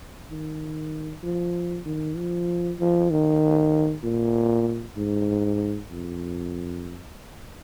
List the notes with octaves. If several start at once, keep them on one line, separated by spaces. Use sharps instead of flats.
D#3
F3
D#3
F3
F3
D#3
A#2
G#2
F2